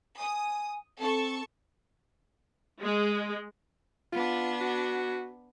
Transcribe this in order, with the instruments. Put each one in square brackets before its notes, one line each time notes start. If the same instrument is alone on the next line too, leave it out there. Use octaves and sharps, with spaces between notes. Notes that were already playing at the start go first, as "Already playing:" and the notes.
[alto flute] G#5 [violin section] D#6
[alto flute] C4 [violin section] A4 A5 C#6
[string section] G#3
[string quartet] B3 D4 [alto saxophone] F4
[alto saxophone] F#4